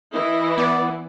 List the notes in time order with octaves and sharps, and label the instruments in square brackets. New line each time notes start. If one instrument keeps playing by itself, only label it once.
[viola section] E3 E4 [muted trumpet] D#5
[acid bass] B3 [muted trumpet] D5